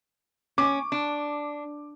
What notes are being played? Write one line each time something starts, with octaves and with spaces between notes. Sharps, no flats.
C#4 D6
D4